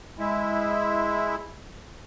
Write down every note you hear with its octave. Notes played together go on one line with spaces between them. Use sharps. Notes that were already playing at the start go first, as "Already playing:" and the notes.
G#3 E4